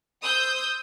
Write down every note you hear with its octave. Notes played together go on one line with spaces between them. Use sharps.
C5 D#6 E6 G6